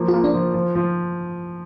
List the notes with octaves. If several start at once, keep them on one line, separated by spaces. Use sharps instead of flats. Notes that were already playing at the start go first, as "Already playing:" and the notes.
Already playing: F3 A#3
F4
A#3
D4
F3
F3
F3